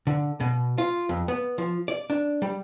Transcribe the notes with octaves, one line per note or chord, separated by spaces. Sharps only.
D3
B2
F4
F2
B3
F3
D5
D4
G3